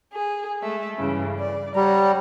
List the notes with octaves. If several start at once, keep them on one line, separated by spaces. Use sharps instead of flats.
G#4
G#3 A3 E5
G2 C#3 E3
D5
G3 C#5 F#5 A#5